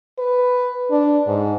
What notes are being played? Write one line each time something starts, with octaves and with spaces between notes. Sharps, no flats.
B4
D4
G#2